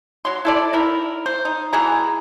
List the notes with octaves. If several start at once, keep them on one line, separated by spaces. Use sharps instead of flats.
F#3 C6
E4 A4 D5
D#3 E4 A#4
C5
D#4
B2 E3 G#4 A#5